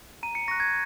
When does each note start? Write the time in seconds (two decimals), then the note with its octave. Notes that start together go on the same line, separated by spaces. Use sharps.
0.23 A#5 D#7
0.35 C#7
0.48 C#6 F#6 A#6
0.60 G#6